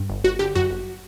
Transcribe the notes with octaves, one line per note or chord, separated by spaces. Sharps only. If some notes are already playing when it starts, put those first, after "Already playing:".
Already playing: G2
G1
G1 F#4
D3 G4
F#2 F#4
G1